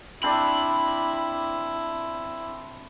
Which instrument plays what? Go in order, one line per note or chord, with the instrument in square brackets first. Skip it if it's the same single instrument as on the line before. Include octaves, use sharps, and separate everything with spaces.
[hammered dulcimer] C4 D4 D5 [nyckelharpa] E4 [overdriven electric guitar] B5